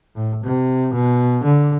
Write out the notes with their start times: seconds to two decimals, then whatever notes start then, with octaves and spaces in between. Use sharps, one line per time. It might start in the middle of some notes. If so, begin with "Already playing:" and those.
0.16 A2
0.44 C3
0.94 B2
1.44 D3